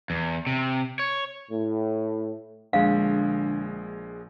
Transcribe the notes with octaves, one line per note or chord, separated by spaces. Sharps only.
E2
C3
C#5
A2
A#1 D3 G#3 F5